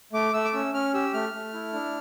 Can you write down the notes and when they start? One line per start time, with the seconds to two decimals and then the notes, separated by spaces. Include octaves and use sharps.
0.13 A3 D6
0.34 A3 E6
0.45 D6
0.53 C#4 E6
0.74 C#4 F6
0.94 G4 E6
1.13 A3 F6
1.33 A3
1.54 E4
1.73 D4